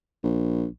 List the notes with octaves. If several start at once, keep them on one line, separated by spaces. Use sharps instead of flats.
A#1